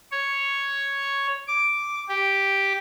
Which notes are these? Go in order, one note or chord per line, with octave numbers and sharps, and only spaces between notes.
C#5
D6
G4